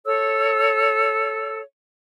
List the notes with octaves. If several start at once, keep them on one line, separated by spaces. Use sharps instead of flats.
A4 C#5 E6